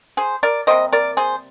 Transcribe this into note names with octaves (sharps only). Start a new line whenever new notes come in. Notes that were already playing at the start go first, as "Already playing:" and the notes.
G#4 C5
A#4 D5
C3 G3 A#3 C5 D#5
A#4 D5
G#4 C5